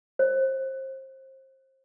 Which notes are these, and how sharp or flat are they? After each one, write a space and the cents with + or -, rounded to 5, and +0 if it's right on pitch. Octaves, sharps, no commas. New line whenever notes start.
C5 +30